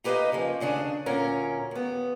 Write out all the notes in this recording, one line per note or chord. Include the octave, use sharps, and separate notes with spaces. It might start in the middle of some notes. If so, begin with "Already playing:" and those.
D#4 G4 B4 C5 D#5 F5
C#3 F3 A#3
D#2 C#3 D4 G#4
D2 A#2 C#4 A#4
D#2 B3